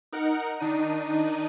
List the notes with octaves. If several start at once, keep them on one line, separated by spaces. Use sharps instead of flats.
D#4 A#4 F#5
D#3 D4 D#4 D#7